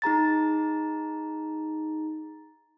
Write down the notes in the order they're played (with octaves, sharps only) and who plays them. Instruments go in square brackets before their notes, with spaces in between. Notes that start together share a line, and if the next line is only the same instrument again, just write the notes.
[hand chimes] D#4 G#4 A#5 A6